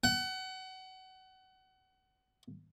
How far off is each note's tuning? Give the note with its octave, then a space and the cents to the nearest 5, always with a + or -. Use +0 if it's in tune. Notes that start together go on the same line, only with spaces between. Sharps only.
F#5 +30